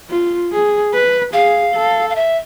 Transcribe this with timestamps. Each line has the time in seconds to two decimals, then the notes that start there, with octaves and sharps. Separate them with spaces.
0.10 F4
0.52 G#4
0.93 B4
1.33 G#4 F5
1.74 A4
2.10 F5
2.16 E5